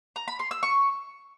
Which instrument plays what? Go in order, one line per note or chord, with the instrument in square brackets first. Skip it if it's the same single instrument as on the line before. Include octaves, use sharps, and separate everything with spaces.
[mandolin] A#5
B5
C6
E6
C#6